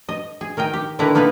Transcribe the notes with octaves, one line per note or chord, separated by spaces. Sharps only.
D#5
G#4
D#3 A#4 D#5 G5
G4
A#2 D3 D#3 E4 B4 A#5
A#3 B3 D#4 A#4 B4